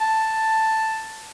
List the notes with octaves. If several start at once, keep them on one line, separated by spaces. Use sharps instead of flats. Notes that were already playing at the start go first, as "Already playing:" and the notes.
A5